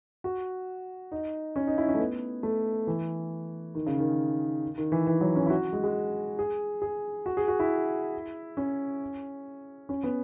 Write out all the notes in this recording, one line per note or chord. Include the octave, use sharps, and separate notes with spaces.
F#4
D#4
C#4
D#4
E4
C#4
A3
B3
A3
E3
D#3
C#3
D#3
D#3
E3
E3
F#3
C#4
E4
F#4
G#3
G#3
G#4
G#4
F#4
G#4
F#4
E4
C#4
C#4
B3